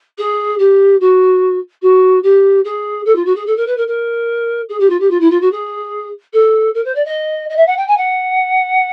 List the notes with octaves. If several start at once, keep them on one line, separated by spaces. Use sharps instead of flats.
G#4
G4
F#4
F#4
G4
G#4
A4
F4
F#4
G#4
A4
A#4
B4
A#4
A#4
G#4
G4
F4
G4
F4
E4
F4
F#4
G#4
A4
A#4
C5
D5
D#5
D#5
E5
F#5
G5
G#5
F#5